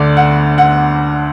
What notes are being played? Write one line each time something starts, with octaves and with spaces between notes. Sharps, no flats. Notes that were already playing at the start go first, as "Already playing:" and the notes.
Already playing: D2 D3 D5
F#5
F#5